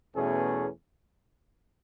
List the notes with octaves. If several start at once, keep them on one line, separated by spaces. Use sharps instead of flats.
E2 B2 A3 C#4 G#4